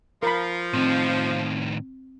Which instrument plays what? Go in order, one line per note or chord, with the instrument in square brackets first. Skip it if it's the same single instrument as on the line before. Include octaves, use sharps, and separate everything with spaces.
[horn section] F3 [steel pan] A#4 B5
[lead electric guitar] A2 D#3 [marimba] C4